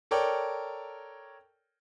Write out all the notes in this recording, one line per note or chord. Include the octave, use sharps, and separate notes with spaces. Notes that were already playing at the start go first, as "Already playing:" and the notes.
A4 A#4 C#5 D5 G5